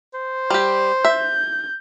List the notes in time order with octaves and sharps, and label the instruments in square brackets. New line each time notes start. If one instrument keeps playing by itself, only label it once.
[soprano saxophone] C5
[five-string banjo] G3 G4
[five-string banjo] E5 [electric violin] G6